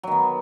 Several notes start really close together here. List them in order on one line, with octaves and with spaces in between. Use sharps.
F#3 D#3 B3